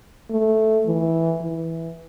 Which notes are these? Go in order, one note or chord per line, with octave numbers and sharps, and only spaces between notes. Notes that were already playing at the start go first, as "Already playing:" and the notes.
A3
E3
E3